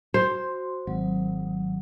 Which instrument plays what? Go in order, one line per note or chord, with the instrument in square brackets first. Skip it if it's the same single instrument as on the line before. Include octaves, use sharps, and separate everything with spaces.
[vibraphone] F#4 C6 [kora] C5
[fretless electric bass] G#1 [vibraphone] F#3